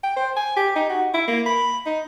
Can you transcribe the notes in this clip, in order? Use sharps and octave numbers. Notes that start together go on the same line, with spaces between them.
G5
C5
G#5
G4
D#4
F#4
E4
A#3
B5
D#4